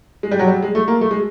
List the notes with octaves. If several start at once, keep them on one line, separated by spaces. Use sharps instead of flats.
G#3
G3
F#3
G3
G#3
A3
A#3
A3
G#3